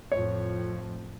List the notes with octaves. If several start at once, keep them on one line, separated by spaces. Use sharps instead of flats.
F2 A2 F3 C#5